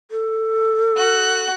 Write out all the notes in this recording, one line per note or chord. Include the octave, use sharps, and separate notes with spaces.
A4
F#4 F#6